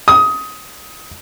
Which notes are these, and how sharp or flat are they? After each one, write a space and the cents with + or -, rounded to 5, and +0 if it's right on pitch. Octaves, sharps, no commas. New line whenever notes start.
D#6 +20